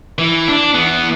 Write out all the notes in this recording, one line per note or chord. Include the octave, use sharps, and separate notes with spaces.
E3
D4
E3 B3